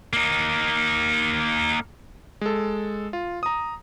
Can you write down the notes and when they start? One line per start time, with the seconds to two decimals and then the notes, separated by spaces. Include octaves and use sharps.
0.13 A#3 D#4
2.41 G#3 A4
3.13 F4
3.43 A#5 D#6